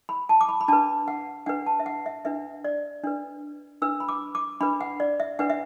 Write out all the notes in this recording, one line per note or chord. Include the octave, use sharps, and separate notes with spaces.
B5
A5
D6
B5
B5
D4 B4 A5
F#5
D4 B4 F#5
A5
E5
F#5
E5
D4 B4 E5
D5
D4 B4
D4 B4 E6
B5
D6
D6
D4 B4 B5
F#5
D5
E5
D4 B4 F#5
E5